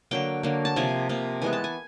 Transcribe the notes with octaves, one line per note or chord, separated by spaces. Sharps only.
D3 F#3 A#3 G5
D3 F#3 A#3
A5
C3 F3 A#3 G#5
C3 F3 A#3
E3 G#3 B3 G#5
A5
G#5